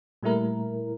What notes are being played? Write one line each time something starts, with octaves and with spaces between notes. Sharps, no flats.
A#2 G3 A3 E4 A#4